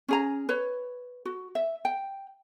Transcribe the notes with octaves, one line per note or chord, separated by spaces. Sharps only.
C#4 G#4 A#5
B4 C#5
F#4
E5
G5